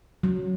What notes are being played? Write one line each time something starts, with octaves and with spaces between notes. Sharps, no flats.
F#3